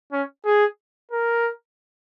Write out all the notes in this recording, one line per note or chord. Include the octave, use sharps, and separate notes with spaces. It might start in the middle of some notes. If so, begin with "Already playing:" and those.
C#4
G#4
A#4